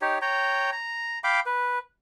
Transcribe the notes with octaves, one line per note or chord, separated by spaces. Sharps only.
D#4 G4 C#5
C#5 G5 A#5
A#5
F5 G5 B5 D6
B4